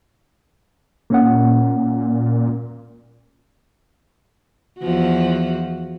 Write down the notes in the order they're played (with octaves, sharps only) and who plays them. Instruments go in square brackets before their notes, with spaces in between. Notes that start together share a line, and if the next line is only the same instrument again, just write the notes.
[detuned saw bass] A#2 [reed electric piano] A#3 C#4 F#5
[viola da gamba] E2 F3 F#4